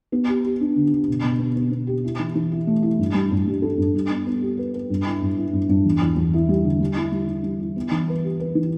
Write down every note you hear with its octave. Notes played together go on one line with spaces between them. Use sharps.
B3
G4
G4
D4
D3
D3
B2
B2
B3
B3
B3
G4
E4
E3
E3
E4
A3
E4
G2
G3
G2
G3
A4
G2
G3
B3
B3
G4
B4
B4
G2
E4
G2
E4
G2
G2
E2
E2
E2
E4
G3
D3
G3
E4
G3
G3
G3
E4
B3
E3
B4
G4
B4
E3